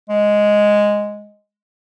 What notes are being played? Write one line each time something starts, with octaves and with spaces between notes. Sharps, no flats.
G#3